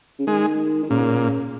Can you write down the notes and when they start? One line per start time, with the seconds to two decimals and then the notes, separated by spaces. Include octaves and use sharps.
0.19 C#3
0.27 D#3 G#3
0.83 D#3
0.90 A#2 C#3